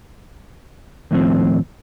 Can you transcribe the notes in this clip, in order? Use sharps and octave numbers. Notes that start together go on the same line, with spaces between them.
D#2 A2 F3 C4